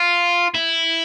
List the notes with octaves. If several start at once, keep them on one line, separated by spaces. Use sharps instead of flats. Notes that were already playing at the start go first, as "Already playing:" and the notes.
Already playing: F4
E4